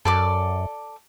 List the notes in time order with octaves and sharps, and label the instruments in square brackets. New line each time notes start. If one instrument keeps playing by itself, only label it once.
[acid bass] F#2 [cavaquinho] A4 D5 D6